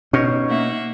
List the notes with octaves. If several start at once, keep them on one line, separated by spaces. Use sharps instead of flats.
B2 C#4 D#4 C#5
A#3 E5 F#5